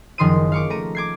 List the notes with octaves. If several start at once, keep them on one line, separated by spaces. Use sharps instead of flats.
F#1 D#3 F3 C6 D#6 D#7
F5 C#6 D6
A3 A#5 D#7
D6 G#6 C7